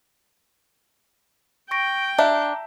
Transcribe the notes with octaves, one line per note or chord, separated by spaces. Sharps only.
G5 C#6 A#6 D7
D4 E5 A#5